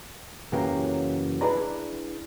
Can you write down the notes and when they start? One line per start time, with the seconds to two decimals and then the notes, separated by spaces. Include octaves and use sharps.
0.52 F#2 C#3 E3 F#3 A#3 G4
1.41 D4 E4 G#4 B4 D5 A#5